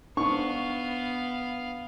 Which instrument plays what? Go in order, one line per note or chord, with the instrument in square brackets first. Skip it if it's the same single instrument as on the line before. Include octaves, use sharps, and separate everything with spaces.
[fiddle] B3 F5 [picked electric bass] D4 [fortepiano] C#6